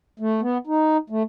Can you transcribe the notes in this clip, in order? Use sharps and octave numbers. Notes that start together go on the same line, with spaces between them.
A3
B3
D#4
A3